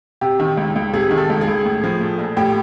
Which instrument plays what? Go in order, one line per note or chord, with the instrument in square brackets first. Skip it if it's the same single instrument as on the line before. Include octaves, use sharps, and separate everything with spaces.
[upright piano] C3 G4
D#3
C#2
C#2
C3 G#4
D#3
A4
C#2
G#4
C#2
A2
F3
A3
A#1
A2 G4